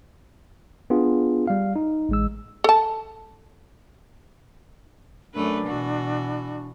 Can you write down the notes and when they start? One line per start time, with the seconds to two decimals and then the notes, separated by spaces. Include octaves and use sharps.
0.90 B3 D4 F4 G#4
1.47 G3 F5
1.76 D#4
2.09 A1 G#3 E6
2.64 A4 A5
5.34 F#2 A3 D4 B4
5.66 B2 E3 F#4